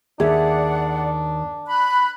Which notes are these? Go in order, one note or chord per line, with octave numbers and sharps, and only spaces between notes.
D#2 D4 G#4 D5 E5 F#5
B5 F#6